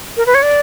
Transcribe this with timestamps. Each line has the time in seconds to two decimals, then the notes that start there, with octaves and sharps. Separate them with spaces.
0.17 A#4
0.26 B4
0.34 C#5
0.43 D5